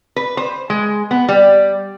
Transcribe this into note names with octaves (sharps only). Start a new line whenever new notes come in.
B4
C5
G#3
B3
G3